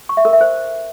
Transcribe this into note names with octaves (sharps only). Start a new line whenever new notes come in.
C#6
E5
A#4
E5
C5